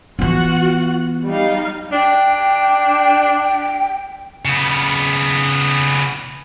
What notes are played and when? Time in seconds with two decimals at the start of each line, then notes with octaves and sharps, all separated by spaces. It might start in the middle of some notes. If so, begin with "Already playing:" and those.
0.19 E3 B3 F4 F#4 F#5
1.24 G3 D#4 F5
1.92 D4 G5
4.45 C#3 B3